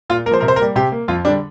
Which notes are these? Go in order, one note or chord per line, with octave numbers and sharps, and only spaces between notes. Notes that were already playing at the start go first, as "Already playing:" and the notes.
A#2 F4
A#3 A#4
F3 C5
C3 A#4
C5
A#4
G3 A#3
C3 G4
A#3
F2 F4
D3 G3 D4